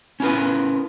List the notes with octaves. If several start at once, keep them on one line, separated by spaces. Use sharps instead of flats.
C#4 E4 G4 A#4 B4